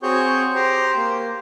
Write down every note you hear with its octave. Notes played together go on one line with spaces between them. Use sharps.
C4 F#4 G#4 C#5 C#6 G6
G4 C5 A#5 C6
A#3